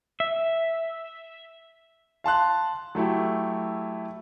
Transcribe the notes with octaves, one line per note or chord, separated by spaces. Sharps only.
E5
F5 A5 C6 F#6
F#3 A3 E4 G4